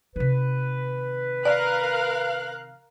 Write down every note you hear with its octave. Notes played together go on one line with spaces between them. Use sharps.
C3 D#3 B4
A#4 D5 F5 F#6